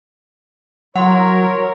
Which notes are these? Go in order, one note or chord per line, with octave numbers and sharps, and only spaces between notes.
F#3 E4 A#4 C#5 F#5 C6